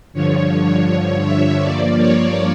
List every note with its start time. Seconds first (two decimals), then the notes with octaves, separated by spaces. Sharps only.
0.13 G2 D3 F3 C#5
0.51 C#5
1.25 E5
1.61 G2 F3 A#3 D5
1.98 C#5